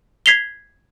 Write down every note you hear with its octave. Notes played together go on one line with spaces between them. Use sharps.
G#6 B6 C7 F7 G7